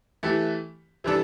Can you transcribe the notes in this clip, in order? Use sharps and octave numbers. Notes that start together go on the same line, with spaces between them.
E3 A3 E4 G4
C3 E3 G3 D4 A4